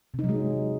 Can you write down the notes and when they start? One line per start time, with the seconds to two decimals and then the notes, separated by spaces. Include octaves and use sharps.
0.14 C3
0.19 D#4
0.24 F#3
0.29 G#3